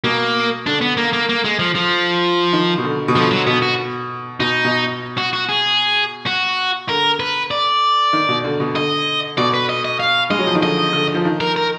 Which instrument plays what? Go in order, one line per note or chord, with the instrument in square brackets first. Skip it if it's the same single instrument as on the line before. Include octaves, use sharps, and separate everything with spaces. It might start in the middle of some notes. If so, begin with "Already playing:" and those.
[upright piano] B2 [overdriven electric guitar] A#3
[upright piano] D3 [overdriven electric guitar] D4
[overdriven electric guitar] B3
A#3
A#3
A#3
G#3
F3
F3
[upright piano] D#3
B2
D3
B2
[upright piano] D3 [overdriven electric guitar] F3
[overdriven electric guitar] F#3
[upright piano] B2 [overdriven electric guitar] B3
[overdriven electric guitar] F#4
[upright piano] B2 [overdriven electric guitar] D#4
[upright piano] B2
[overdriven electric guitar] F#4
F#4
G#4
F#4
[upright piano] D3 [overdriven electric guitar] A#4
[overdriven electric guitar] B4
D5
[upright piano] D#3
B2
D3
B2
[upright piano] D3 [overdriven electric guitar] D#5
[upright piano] B2 [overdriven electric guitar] D5
[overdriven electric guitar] B4
D#5
D#5
F5
[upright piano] G#3 [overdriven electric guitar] D#5
[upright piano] F#3
F3
D#3
[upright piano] D3 [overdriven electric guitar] D#5
[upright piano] D3
F3
D#3
[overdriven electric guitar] A#4
A#4